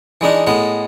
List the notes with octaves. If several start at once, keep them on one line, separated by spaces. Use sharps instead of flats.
E3 G#3 D4 D#4
A2 G#3 B3